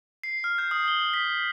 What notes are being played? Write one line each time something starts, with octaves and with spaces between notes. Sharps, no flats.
C7
F6
G6
D#6
G7
B6